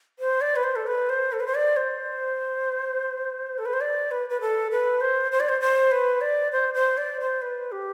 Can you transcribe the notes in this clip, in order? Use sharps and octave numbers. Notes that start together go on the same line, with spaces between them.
C5
D5
B4
C5
A4
B4
C5
A4
B4
C5
D5
C5
A4
B4
C5
D5
B4
B4
A4
B4
C5
C5
D5
C5
C5
B4
D5
C5
C5
D5
C5
B4
G4